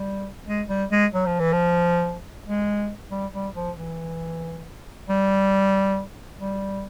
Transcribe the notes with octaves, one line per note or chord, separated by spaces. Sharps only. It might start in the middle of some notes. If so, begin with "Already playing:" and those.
Already playing: G3
G#3
G3
G#3
F#3
F3
E3
F3
G#3
G3
G3
F3
E3
G3
G3